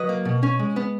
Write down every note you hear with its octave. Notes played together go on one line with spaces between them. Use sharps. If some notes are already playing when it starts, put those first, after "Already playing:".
Already playing: F#3 B4 D#5
A#3
B2
C#4
G#3
B3